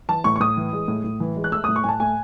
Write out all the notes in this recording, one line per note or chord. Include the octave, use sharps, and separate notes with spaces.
E3 A5
A2 C#6
C#6
A2 D#6
E3
G#3
A2
A2
E3
G#3
F#6
A3 E6
D#6
A2
C#6
A2 G#5 A5
A3 G#5